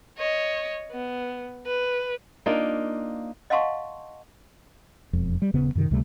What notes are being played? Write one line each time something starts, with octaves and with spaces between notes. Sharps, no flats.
C#5 D#5
B3
B4
A#3 D4 D#4 F4
D#5 F5 F#5 A5 C6 C#6
E1 F2
G3
D#1 C#3 B3
F#2 C3 D#3
C#2 C3 G3 A3